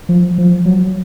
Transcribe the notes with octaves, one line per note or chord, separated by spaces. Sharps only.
F3
F3
F#3